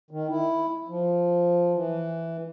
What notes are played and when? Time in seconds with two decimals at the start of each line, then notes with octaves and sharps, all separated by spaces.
0.11 D#3
0.30 E4
0.88 F3
1.75 E3